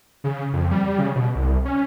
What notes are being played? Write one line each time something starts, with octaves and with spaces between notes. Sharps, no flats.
C#3
F2
G3
C#3
B2
C2
C#4